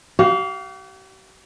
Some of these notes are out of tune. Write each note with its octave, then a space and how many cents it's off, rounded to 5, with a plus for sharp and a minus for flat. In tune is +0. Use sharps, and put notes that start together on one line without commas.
G4 -45 F5 +5